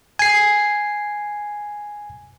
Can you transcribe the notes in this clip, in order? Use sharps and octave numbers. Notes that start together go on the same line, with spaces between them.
G#5 C7